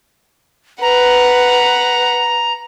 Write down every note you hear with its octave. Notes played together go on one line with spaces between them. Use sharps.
B4 F#5 A#5